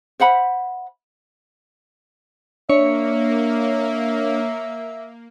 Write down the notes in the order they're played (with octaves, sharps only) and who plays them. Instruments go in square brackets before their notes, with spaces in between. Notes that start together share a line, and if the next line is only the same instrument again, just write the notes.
[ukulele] C5 E5 F#5 B5
[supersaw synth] A#3 [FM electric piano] D4 [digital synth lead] C#5 [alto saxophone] E5